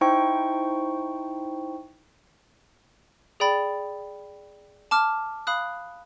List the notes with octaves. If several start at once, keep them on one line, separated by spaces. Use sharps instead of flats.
D#4 E4 C5 G5 C#6
G#4 D5 G5 B5 A6
A5 D6 F6
F5 B5 D#6 F#6